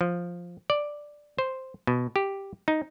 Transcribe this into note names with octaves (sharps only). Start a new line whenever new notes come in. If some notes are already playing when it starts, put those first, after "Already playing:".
F3
D5
C5
B2
G4
D#4